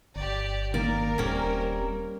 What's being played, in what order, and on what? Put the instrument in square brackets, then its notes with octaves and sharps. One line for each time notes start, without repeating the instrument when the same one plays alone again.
[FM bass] G1 [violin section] G4 D5
[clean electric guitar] D#3 A#3 [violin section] A#4 [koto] D5
[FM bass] D#1 [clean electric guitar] G3 C4 [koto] A#3 C#4